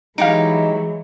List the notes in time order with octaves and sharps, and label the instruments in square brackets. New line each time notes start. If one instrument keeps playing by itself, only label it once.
[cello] E3 F#3 [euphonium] G#3 [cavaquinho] D#4 E4 G4 [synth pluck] F5 D7